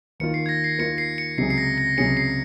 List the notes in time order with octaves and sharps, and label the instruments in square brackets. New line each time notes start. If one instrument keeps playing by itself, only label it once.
[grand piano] D#2 D#3 A#3 F4 A#4 [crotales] C#7
[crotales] C7
G#6
A#6
C7
[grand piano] D#2 D#3 A#3 F4 A#4 [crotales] C#7
[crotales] C7
C#7
[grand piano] C#2 C3 F#3 C#4 G#4 [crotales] C7
[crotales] C7
A#6
A#6
[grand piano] C#2 C3 F#3 C#4 G#4 [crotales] C#7
[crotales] C7